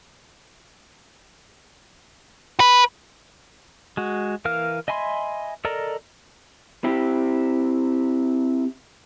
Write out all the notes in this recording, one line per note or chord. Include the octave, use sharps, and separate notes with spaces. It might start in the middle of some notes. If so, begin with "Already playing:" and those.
B4
G#3 F#4
E3 A#4 F5 F6
D#5 E5 G#5 B5 C6
A4 A#4 D5 D#5 A#5
C4 E4 G4